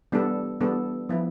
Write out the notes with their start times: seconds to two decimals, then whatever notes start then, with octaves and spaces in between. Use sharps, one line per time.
0.12 E3 G3 B3 D4 A4
0.61 E3 G3 B3 D4 A4
1.09 F3 B3 E4